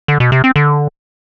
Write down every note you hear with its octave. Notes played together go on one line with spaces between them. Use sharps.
D3
B2
C3
C4
D3